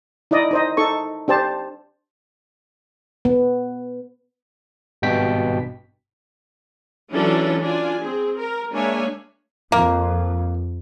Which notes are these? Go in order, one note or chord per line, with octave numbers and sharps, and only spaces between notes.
D#4 E4 D5 D#5
D#4 C5 D#5
D#4 A4 C#6
D4 G4 C5 A5
B3
G#1 G2 B2 G5 B6
E3 F#3 C#4 D4 F4 A4
D4 F4 G#5
C4 G#4
A#4
G#3 A#3 D4 C#5 E5 G#5
F2 A#3